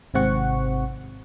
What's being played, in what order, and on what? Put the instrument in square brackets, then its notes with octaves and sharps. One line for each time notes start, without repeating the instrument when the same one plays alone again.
[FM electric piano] G#1 G#2 C3 C4 F#5 C#6